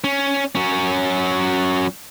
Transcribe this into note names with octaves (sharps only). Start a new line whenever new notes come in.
C#4
F#3 C#4